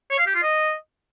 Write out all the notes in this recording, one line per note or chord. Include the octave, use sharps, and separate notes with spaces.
C#5
F5
G4
F4
D#5